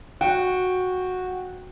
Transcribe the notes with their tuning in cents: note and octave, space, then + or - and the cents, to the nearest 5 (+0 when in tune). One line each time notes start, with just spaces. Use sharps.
F#4 -10 G5 +0